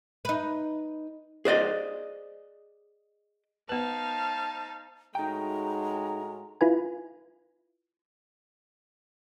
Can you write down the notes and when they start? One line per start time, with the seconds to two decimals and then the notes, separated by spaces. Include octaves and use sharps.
0.25 D#4 B4
1.45 G#4 C5 D5 D#5
3.69 B3 D#4 B4 C5 F5 A5
5.15 A2 G#3 D#4 F#4 G5 A#5
6.61 E4 F4 B4 G#5